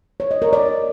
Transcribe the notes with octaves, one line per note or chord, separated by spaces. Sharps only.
C#5
D#5
A#4
D5